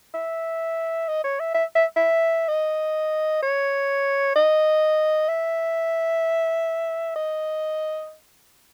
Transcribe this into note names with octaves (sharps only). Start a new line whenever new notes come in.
E5
D#5
C#5
E5
E5
E5
E5
D#5
C#5
D#5
E5
D#5